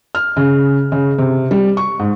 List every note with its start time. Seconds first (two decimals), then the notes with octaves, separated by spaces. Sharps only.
0.15 F6
0.37 C#3
0.92 C#3
1.18 C3
1.51 G3
1.77 C#6
1.99 G#2